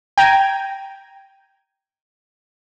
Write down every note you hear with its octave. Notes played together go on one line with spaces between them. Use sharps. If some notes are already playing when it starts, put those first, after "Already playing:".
G5 A#5 G#6 D#7